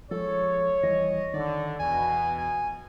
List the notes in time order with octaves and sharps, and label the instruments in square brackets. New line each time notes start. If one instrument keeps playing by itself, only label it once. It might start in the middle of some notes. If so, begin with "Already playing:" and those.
[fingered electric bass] F3 G#3 [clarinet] A4 [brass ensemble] C#5
[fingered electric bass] D#2 E3 G3 [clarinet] D#5
[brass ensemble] D3 [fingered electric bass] D#3 [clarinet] D5
[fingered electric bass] E2 [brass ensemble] B2 [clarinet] G#5
[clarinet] G#5